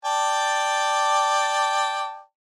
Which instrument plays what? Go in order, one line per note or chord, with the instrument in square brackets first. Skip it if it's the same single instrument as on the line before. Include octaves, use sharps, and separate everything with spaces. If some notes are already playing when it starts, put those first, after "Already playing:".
[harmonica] D5 G5 A5